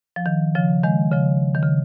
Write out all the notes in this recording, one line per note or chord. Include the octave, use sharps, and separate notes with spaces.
F3
D#3
C#3 F3
D#3 G#3
C#3 F3
D#3
C#3